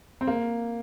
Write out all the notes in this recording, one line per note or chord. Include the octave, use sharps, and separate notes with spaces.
C4
A#3